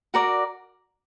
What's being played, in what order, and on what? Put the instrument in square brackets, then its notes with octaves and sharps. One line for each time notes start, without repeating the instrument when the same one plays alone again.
[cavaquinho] F#4 A#4 D5